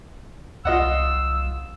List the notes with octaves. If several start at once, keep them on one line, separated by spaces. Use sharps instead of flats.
C2 F4 D#5 F#5 E6